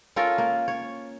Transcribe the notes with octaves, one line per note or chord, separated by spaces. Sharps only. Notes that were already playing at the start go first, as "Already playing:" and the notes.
C#4 F4 A4 A#4
A#3
C#5